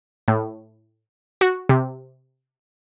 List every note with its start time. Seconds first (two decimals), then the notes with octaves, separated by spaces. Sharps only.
0.28 A2
1.41 F#4
1.69 C3